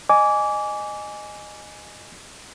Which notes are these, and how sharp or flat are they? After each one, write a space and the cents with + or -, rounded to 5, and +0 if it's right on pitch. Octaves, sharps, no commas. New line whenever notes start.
D#5 -20 G#5 +0 D6 -25